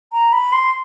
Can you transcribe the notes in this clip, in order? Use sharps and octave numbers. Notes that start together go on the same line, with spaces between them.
A#5
B5
C6